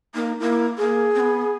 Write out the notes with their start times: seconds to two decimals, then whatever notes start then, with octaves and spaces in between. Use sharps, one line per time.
0.15 A#3 D#4
0.40 A#3 E4
0.78 A#3 G#4
1.15 C4
1.20 B3